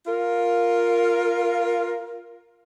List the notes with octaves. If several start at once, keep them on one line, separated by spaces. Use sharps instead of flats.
F4 A#4